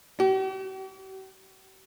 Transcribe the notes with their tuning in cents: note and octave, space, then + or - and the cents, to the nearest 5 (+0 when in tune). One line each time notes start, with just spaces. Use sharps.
G4 -45